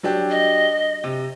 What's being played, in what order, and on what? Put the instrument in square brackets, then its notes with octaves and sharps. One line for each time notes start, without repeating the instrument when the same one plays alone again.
[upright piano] F#3 D4 G4
[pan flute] D#5
[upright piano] C3